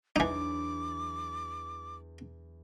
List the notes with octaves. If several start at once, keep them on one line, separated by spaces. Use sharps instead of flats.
E2 E3 F#3 D4 D#4 D6